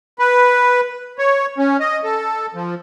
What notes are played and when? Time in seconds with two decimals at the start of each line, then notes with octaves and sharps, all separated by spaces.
0.19 B4
1.18 C#5
1.58 C#4
1.80 D#5
2.04 A4
2.55 F3